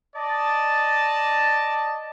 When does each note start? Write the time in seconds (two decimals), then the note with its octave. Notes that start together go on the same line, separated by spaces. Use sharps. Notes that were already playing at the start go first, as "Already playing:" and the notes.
0.15 D5 D#5 A5